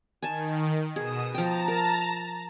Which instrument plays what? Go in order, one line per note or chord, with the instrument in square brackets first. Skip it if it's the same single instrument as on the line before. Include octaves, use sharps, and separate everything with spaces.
[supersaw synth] D#3 [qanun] G#5 A5
[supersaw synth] B2 D#6 E7 [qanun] G#4
[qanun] F3 G5 [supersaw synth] A5 A#5
[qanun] A#4